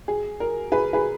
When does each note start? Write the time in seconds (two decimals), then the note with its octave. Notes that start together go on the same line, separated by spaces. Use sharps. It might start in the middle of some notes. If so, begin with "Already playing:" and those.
0.08 G#4
0.40 A#4
0.72 G#4 B4
0.93 G#4 B4